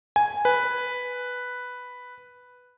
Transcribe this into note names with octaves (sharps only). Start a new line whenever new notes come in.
G#5
B4